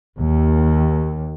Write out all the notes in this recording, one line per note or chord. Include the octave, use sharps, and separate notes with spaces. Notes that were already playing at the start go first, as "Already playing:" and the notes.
D#2